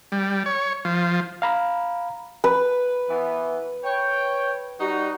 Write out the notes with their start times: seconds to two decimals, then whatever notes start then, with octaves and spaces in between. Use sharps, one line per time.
0.12 G3
0.46 C#5
0.85 F3
1.42 F5 A#5 B5
2.44 B4
3.10 E3 B3
3.84 C#5 G5
4.79 G3 D#4 F#4